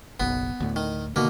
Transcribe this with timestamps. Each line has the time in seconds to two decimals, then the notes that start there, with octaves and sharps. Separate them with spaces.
0.20 F#1 B1 B3
0.60 D2 A2
0.76 D#3
1.16 B2 D3 D#3 A#3